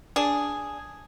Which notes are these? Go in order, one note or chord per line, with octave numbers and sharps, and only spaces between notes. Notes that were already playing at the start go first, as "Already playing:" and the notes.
D4 G#4